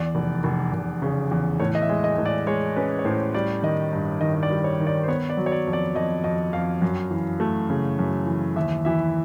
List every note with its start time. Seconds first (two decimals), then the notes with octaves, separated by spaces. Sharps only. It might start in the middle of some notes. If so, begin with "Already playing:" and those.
Already playing: E2 D5
0.15 F1
0.44 F1
0.73 F1
1.02 C#3
1.31 E2
1.60 A2 C#5
1.75 D#5
1.82 E5
1.89 G#3
2.04 D#5
2.18 A2
2.26 D5
2.47 G#3 C#5
2.76 C#4 B4
2.99 C#5
3.05 A2 C5
3.34 G3 D5
3.63 D#3 D#5
3.93 G2 D#5
4.21 D#3 D#5
4.34 D#5
4.43 D5
4.50 G3
4.64 C#5
4.80 D#3
4.87 D5
5.03 C5
5.08 B3 C#5
5.29 D5
5.37 F#3
5.46 C#5
5.52 D5
5.67 F2
5.73 D5
5.95 F2 D#5
6.24 F2 D#5
6.53 F2 F5
6.82 F#2
7.11 E3
7.40 A3
7.70 C#3
7.99 F#2
8.27 E3
8.56 D#2 E5
8.85 E3 E5